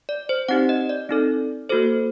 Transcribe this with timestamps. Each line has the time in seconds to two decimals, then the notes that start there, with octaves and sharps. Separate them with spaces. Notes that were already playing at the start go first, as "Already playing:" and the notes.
0.09 D5
0.29 C5
0.48 C4 D#4 G4 F#5
0.69 D#5
0.89 D5
1.09 C4 D#4 A4
1.69 A#3 F#4 A4 C5